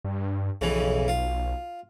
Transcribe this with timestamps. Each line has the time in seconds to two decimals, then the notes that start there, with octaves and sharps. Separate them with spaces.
0.04 G2
0.61 B1 F2 C#3 E3
1.08 F4